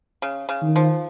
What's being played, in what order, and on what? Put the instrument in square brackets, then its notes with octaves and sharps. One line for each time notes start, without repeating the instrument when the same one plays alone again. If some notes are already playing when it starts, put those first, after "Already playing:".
[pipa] C#3
C#3
[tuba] D#3
[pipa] F3